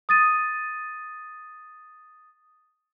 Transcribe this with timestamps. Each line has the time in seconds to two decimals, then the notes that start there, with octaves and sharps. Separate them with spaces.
0.09 D#6 A6 D#7